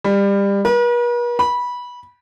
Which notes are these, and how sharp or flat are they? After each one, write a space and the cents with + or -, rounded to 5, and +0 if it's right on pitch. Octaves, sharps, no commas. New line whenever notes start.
G3 +25
B4 -45
B5 -15